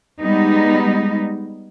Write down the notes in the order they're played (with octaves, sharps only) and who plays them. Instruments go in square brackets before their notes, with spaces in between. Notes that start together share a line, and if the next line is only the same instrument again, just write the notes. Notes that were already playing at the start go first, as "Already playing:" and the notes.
[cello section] G3 G#3 B3 D#4